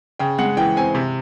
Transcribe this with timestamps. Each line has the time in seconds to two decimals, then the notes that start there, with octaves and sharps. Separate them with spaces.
0.19 C#3 G5
0.39 G#3 F#5
0.57 E3 G5
0.76 C4 G#5
0.95 C3